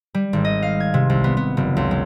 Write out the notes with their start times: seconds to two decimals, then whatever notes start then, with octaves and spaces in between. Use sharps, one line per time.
0.15 G3
0.33 G#1
0.45 D#5
0.62 F5
0.80 G#6
0.94 C3
1.10 C2
1.24 B3
1.37 B3
1.57 F#1
1.77 C#2
1.91 G#3